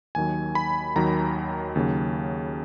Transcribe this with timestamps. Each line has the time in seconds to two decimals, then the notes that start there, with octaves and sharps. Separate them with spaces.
0.15 D#2 D#3 F#3 G#5
0.55 B5
0.96 D#2 D#3 F#3 A#5
1.76 D#2 C#3 F#3